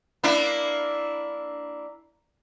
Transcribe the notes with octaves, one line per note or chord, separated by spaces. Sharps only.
A#3 D4 E4